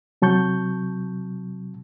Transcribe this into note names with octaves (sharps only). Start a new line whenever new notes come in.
C3 F#3 A5 C#6 G6